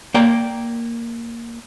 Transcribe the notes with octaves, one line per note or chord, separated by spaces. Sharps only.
A#3 D5 G5